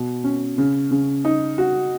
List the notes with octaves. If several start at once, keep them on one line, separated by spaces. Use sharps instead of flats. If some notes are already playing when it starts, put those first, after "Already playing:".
Already playing: B2
C#4
C#3
C#3
D#4
F#4